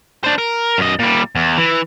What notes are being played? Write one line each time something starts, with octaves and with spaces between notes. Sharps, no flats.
D4 C5
A#4
F#2 D#5
A#2 G3
E2
E3